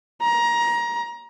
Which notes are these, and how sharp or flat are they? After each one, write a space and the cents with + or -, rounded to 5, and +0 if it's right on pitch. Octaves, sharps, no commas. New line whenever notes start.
A#5 +20